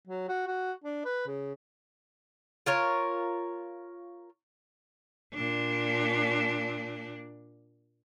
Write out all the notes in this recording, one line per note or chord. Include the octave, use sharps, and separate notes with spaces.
F#3
F#4
F#4
D4
B4
C#3
F4 A#4 C#5
A#2 D4